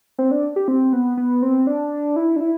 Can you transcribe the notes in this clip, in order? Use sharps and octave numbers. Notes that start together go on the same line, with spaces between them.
C4
D4
G4
C4
B3
B3
C4
D4
E4
D4
E4